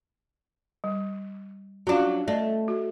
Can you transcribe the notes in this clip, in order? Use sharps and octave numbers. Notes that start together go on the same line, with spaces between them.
G3
F#3 C#4 D4 F4 F5
A3 D5 D#5
F#4